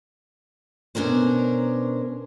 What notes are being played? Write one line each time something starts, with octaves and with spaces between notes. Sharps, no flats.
B2 C#4 D4 A#4 C5